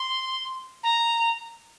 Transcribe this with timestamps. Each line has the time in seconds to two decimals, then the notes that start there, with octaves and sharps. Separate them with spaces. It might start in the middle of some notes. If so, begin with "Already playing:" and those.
Already playing: C6
0.83 A#5